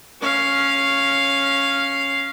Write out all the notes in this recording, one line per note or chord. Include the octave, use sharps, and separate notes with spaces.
C#4 F5